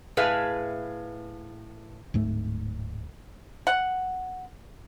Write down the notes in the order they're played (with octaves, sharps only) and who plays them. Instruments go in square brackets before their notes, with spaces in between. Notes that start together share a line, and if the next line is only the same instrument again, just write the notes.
[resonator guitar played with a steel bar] A2 G#4 B4 E5 F5
[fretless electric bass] D1 G#2 A3
[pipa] F#5